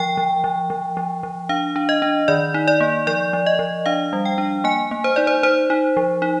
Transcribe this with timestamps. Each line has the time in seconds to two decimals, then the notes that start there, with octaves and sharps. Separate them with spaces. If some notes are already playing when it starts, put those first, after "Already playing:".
Already playing: F3 G5
0.17 F3
0.44 F3
0.70 F3
0.97 F3
1.23 F3
1.49 D4 F5
1.76 D4
1.89 D#5
2.02 D4
2.28 D#3 D5
2.54 D#4
2.68 D5
2.81 A#3
3.07 F3 D5
3.33 F3
3.46 D#5
3.59 F3
3.86 D4 F5
4.13 G3
4.25 G5
4.38 D4
4.64 A#3 G#5
4.91 A#3
5.04 C5
5.16 D#4 D5
5.27 C5
5.43 D#4 C5
5.70 D#4
5.97 F3
6.22 D#4